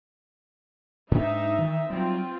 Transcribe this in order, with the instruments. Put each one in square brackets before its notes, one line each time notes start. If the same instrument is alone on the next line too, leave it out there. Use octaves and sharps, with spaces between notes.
[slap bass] G#2 D4 [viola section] D#4 E5
[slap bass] D#3 E3
[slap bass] F#3 G3 [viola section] C4 F4